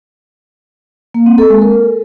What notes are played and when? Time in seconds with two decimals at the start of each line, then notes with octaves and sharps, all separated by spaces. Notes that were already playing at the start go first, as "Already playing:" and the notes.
1.14 A#3
1.26 C4
1.38 A4
1.50 G#3
1.62 A#4